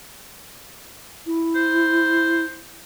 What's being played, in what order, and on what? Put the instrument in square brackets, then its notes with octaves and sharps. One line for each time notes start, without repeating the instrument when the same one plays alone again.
[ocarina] E4
[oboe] C5